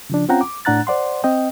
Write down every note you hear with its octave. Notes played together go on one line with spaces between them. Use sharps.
C#3 F3 D4
C4 C#4 F4 F#5 G5 A#5
D6
A2 D4 F#5 A#5 F#6 A6
C5 D5 F#5 C6
C4 D#5 G5